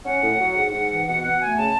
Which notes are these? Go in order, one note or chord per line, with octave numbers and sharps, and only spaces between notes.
C#4 F#5
A2
F#3
G#2
G#2
E3
B2 F#5
B2 F#5
A3 G#5
C#3 A5